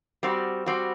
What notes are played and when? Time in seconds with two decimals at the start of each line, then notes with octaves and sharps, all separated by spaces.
0.23 G3 C4 F#4
0.66 G3 C4 F#4